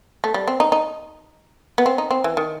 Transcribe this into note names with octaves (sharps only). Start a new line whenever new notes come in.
A3
G3
C4
D#4
D#4
B3
C4
D#4
C4
E3
D#3